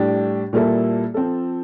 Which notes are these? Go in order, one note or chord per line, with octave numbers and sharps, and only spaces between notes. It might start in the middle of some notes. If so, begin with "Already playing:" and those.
Already playing: A2 G3 D4 G4
A#2 G3 A#3 E4 A4
F3 C4 F4 A4